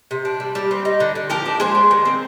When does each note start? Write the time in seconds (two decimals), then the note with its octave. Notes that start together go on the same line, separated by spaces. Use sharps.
0.11 C3
0.25 D4
0.40 G3
0.55 G3
0.71 C4
0.85 D#4
1.00 D3
1.15 D3
1.30 F3 G4 A#4
1.45 D4
1.60 G#3 G#4 C5
1.75 D4
1.91 D#3
2.05 C4